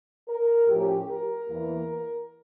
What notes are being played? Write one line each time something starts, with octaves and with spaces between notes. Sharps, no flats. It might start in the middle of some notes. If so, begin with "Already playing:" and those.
A#4
A2 F3 A3 C#4 G4
A#4
E2 E3 A#3